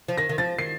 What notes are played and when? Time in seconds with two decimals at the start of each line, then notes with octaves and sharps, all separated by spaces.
0.08 F3
0.17 D#3 A#6
0.29 D#3
0.38 F3 A6
0.58 D#3 C7